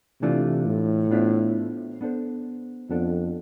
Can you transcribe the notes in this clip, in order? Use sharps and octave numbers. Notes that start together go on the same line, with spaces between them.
C3 E3 A3 D4 F4
A2
B3 D4 F4 C5 E5
B3 D4 A4 C5
F2 B3 D4 A4